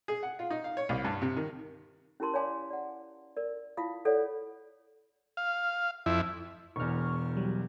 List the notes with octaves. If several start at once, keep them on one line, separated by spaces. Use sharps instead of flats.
G#4
F#5
F4
D#4
F5
C#5
C2
G2
C3
D#3
C#4 E4 G4 A#4 A5 C6
C#5 D5 F5 G#5 C6 D6
D5 F#5
A#4 D5
E4 F4 F5 D#6
A4 C#5 D5 F#5
F5
F2 E4
E1 E2 C#6 F6
F#3 G3